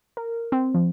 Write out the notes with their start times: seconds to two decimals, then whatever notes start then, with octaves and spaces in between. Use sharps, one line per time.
0.17 A#4
0.52 C4
0.75 F3